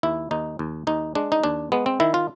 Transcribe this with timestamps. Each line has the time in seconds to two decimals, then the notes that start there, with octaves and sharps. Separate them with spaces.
0.03 D#2 E4
0.31 D#2 D#4
0.59 D#2
0.87 D#2 D#4
1.15 G#3 D4
1.32 D#4
1.44 D#2 D4
1.72 G#3 B3
1.86 C4
2.00 D#3 E4
2.14 F4